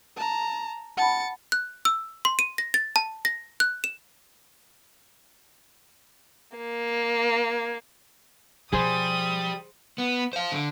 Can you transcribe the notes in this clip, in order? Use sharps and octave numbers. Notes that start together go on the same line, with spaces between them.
A5 A#5
F#5 A5 B5 A6 C#7
F#6
E6
C6
D#7
A#6
A6
A5
A#6
F#6
E7
A#3
B2 F3 G3 G#4 C5 D#6
B3
C5 F5
D3